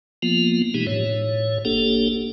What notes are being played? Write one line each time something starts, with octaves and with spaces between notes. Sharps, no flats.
F3 A#3 B3 F4
B2 E3 G#3 D#4 G4
A2 C#5
F#1 A#3 D4 G4 A4